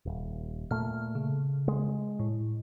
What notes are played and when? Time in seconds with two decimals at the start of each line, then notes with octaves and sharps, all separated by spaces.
0.05 D#1
0.71 A#2 A3 F6
1.15 C#3
1.68 G#3
2.19 A2